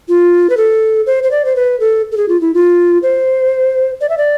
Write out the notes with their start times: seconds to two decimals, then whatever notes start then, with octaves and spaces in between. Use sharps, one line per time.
0.09 F4
0.50 B4
0.57 A4
1.06 C5
1.23 C5
1.31 D5
1.45 C5
1.56 B4
1.80 A4
2.12 A4
2.17 G#4
2.29 F4
2.41 E4
2.54 F4
3.03 C5
4.01 D5
4.09 E5
4.18 D5